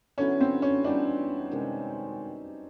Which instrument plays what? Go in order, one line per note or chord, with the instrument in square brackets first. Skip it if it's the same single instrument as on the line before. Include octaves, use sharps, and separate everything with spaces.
[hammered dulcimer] D3 F#3 B3 E4 [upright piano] C#4
[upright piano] C4
C#4
[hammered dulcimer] E3 G3 B3 D#4 [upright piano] D4
[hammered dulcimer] C3 D#3 G#3 C#4